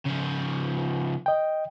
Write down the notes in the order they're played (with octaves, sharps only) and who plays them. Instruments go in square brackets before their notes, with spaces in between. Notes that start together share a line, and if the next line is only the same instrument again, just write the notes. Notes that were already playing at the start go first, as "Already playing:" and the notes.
[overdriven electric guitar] C#3 F3
[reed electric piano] D#5 G5